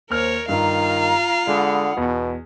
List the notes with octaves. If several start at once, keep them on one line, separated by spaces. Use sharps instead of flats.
D#2 A#4 C5 C#5 F6
G2 D#3 F4 F5 A#5
D3 G#3 F#5 B5 D#6
E2 B2